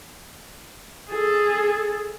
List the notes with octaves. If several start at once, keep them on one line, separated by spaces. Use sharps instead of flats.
G#4 A4